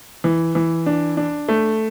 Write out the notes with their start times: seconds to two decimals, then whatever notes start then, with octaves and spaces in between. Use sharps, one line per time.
0.24 E3
0.55 E3
0.86 D4
1.17 D4
1.49 A3